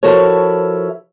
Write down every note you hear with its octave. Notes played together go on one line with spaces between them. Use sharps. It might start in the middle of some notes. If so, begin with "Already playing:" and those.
F3 E4 F#4 A4 A#4 C#5